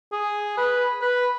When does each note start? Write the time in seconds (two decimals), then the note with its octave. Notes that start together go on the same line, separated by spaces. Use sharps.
0.12 G#4
0.58 B4
1.02 B4